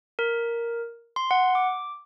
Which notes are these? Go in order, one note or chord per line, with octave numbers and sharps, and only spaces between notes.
A#4
C6
F#5
D6